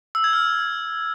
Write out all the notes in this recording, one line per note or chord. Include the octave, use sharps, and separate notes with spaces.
E6
G#6
F6